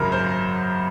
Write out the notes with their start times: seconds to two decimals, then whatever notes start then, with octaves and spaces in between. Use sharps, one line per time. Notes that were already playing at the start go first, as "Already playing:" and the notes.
Already playing: G#1 F#2 C#3 F#3 A#4
0.12 C5